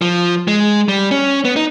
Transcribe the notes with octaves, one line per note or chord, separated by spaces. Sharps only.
F3
G#3
G3
C#4
B3
D#4